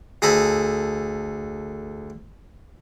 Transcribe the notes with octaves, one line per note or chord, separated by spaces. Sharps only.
D2 G#4 A4 A#5 B5